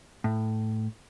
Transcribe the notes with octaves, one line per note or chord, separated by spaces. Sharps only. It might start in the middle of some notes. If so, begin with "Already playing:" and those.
A2